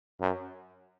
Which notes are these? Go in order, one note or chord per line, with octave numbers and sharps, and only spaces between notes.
F#2